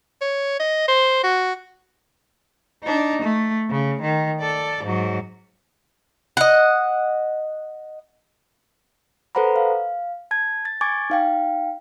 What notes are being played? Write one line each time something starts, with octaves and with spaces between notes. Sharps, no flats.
C#5
D#5
C5
F#4
D4 D#4
A3
C#3
D#3
A4 D5
G#2 F#3
D#5 F#5
A4 B4 C5 F#5 A#5 B5
F5
A5 G#6
A6
G#5 C#6 D6 G#6 A6
D#4 F5 G5